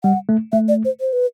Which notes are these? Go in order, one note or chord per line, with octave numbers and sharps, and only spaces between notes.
G3 F#5
A3
A3 E5
D5
C5
C5
B4